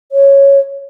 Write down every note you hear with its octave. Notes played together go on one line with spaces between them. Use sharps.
C#5